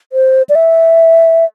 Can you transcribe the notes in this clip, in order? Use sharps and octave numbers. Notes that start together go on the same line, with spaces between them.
C5
D5
E5